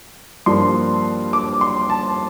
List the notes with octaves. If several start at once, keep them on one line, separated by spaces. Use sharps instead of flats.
G2 F3 A#3 C6
D6
C6
A5